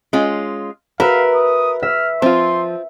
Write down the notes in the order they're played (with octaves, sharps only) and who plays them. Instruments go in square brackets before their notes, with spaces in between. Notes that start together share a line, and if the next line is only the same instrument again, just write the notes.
[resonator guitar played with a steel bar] G#3 C#4 F4
[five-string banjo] F#4 [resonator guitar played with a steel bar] A#4 [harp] B4 E5 [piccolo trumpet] F5
[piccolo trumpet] D#6
[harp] E5 [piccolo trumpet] F6
[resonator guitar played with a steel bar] F3 [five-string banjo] C4 F4 [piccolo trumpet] C6